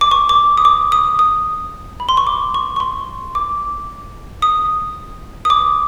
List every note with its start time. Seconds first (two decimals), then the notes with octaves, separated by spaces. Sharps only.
0.01 D6
0.11 C#6
0.29 D6
0.58 D#6
0.65 D6
0.92 D#6
1.19 D#6
2.00 B5
2.09 C6
2.17 C#6
2.27 D6
2.54 C#6
2.76 C#6
2.80 C6
3.35 D6
4.42 D#6
5.45 D#6
5.50 D6